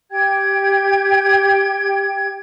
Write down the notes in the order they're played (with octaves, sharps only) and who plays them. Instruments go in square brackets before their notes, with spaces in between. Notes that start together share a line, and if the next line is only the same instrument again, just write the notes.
[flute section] G4 G5 G#6